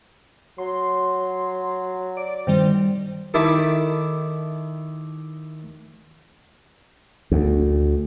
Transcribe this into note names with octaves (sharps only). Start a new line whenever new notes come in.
F#3 C6
D5
G2 D#3 G3 C4
D#3 E4 G4 A4
D2